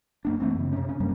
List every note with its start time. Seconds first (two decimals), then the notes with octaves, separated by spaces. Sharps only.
0.25 F#2 A#3 D4
0.40 E3 A3 C4
0.55 F#2 C#3
0.73 C3 C#4
0.89 C#4
1.00 F#2 G3 A#3